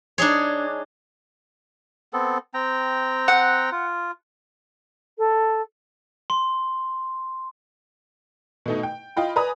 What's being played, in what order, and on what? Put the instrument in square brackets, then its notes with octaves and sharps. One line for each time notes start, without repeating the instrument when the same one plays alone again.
[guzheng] D4 D#4 G#4 C#5
[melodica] B3 C4 A4
C4 G5 A#5
[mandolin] F#5
[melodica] F4
[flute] A4
[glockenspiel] C6
[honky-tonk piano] B2 A3 D#4
G5
F4 D#5 G5 B5
B4 D5 G#5 A#5 B5 D#6